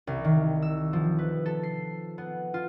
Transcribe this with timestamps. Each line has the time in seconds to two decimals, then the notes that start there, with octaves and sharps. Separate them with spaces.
0.07 C2
0.25 D#3
0.62 E6
0.93 F3
1.19 B4
1.46 A4
1.63 C7
2.18 B3
2.54 F4